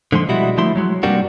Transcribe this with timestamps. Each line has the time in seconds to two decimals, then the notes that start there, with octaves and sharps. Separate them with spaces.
0.12 D3 F3 G#3 C6
0.29 B2 G3 G#3 E4 F#4
0.57 D3 F3 A3 E4 C6
0.76 F#3 G#3 F#4
1.03 G2 C3 G3 A#3 D4 F#4